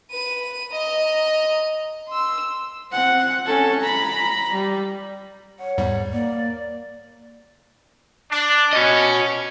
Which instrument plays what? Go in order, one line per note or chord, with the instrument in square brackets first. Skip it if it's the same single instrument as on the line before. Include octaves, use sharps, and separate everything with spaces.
[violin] B4 D#7
D#5 A#5
C6 E6
[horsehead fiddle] C4 F#5
C#4 A4
A#5 B5
G3
[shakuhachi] C#5 [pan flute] F#5
[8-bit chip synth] E2 G#2 G3
[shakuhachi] A#3 [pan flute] D5
[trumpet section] D4
[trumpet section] C#4 [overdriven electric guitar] F#4 D#5